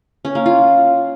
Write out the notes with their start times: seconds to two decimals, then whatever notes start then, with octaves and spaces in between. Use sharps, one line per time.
0.25 C#4
0.35 A#3
0.46 F4